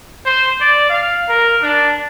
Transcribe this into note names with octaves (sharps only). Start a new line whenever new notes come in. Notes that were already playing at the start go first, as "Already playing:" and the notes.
C5
D5
F5
A#4
D4